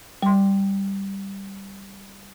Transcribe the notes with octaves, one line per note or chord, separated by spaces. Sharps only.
G3 C6